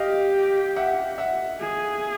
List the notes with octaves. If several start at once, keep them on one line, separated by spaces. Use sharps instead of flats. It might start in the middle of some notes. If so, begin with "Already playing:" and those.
Already playing: G4 D#5 F5
E5 F#5
E5 F#5
G#4